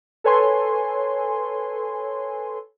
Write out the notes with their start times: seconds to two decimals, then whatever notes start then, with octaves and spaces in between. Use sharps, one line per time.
0.24 A4 B4 C#5 G#5 C6